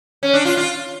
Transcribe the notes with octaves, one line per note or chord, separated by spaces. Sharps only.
C#4
D4
F4
F4